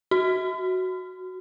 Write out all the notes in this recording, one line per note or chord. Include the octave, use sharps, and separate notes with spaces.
F#4